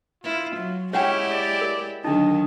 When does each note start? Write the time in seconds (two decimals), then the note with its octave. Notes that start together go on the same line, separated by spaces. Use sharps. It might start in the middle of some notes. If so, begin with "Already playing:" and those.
0.24 E4 F4
0.56 F#3
0.93 G#3 C#4 E4 G4 C#5 F#5 G5
1.31 D5
1.61 A#4
2.04 D3 D#3 F#3 D4 D#4 D#5